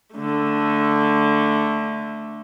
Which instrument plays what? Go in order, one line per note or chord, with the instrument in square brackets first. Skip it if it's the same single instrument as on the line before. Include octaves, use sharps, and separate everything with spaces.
[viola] D3 A3